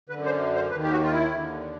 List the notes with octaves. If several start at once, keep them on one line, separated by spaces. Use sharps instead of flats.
F#2 D3 B4
C5
C5
D#2 D#3 B4
G4
F#4
F4
E4
D#2 D3